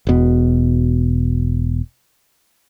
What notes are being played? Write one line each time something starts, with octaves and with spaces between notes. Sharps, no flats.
E1 B2